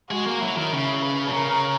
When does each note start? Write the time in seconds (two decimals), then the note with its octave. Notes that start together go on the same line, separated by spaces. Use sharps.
0.10 G#3 F#4
0.26 A#3
0.41 F#3 E4
0.57 D#3
0.71 C#3 E4
1.02 B4
1.29 B2
1.33 C#3 A#4